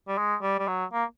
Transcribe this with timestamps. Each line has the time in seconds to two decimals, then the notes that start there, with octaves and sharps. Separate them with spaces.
0.08 G3
0.18 G#3
0.43 G3
0.59 G3
0.68 F#3
0.93 A#3